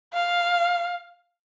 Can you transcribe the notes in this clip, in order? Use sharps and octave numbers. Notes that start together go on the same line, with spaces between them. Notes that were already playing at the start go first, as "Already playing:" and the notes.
F5